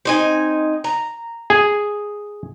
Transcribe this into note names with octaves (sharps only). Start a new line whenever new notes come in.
C4 D#4 G#5
A#5
G#4